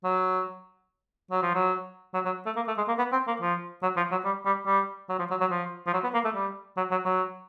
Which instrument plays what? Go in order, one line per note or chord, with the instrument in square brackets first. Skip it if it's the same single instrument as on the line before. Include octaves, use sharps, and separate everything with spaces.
[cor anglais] F#3
F#3
F3
F#3
F#3
F#3
A3
A#3
A3
G#3
A#3
B3
C4
A#3
F3
F#3
F3
F#3
G3
G3
G3
F#3
F3
F#3
F#3
F3
F3
F#3
B3
A#3
A3
G3
F#3
F#3
F#3